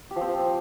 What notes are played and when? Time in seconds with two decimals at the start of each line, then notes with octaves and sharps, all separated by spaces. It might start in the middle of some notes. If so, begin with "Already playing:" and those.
0.11 G4
0.16 F3
0.21 C4